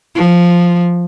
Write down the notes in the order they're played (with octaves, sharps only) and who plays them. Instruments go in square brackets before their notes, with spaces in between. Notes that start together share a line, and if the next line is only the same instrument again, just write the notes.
[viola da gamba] F3